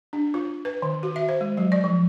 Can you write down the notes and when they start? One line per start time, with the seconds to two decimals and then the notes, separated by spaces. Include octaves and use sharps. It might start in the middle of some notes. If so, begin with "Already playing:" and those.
0.13 D4
0.34 F4
0.65 B4
0.82 D#3
1.03 F#4
1.16 E5
1.29 C5
1.41 G#3
1.57 F#3
1.72 D5
1.84 F3